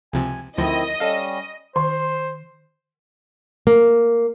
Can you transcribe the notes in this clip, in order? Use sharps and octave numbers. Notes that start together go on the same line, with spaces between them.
C#2 C3 F3 G#5
D2 D#3 F3 C4 E4 D#5
G3 C#4 A4 F5
D#3 C5 C6
A#3